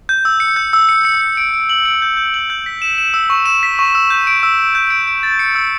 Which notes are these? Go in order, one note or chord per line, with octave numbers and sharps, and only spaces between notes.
G6
E6
C#7
G6
E6
C#7
C#7
C#7
D7
D7
F#7
D7
G6
G6
F#7
G6
B6
E7
E7
E6
C#6
E7
B6
C#6
E6
G6
D7
E6
E6
G6
D7
D7
A6
C#7
E6